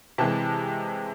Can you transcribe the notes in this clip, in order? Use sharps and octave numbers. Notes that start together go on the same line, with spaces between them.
C3 E3 G#3 A5